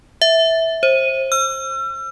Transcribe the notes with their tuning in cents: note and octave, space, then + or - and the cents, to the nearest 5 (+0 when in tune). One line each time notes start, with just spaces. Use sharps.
E5 -10
C5 +25
E6 +45